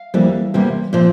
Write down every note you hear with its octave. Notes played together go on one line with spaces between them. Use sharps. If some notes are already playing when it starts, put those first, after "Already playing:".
Already playing: F5
F2 E3 G3 A#3
E2 C3 G3 A#3
A#2 F3 C4